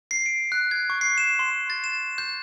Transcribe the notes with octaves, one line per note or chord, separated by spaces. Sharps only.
C7
D7
F#6
G#6
C#6
C7
E7
C6
A6
E7
G6